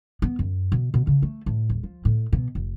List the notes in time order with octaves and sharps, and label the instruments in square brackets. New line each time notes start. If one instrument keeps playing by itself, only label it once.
[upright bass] B3
F#2
B2
B2
C#3
A3
A2
D#1
F3
A2
B2
F1